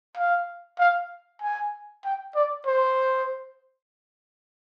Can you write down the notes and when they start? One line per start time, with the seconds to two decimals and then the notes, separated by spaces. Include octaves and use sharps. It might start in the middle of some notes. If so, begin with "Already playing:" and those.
0.17 F5
0.79 F5
1.42 G#5
2.05 G5
2.35 D5
2.67 C5